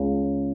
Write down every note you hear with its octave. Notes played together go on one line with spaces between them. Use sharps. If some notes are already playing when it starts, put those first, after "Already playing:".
Already playing: C#2 C#3